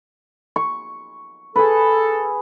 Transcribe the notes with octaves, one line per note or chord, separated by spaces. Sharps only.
C#6
G#4 A4 B4